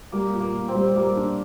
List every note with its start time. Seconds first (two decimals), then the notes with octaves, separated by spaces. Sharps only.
0.12 G3 A#3
0.33 A#2
0.40 A#3
0.54 A#2
0.68 C4
0.75 G3
0.96 G3 A#3
1.17 D4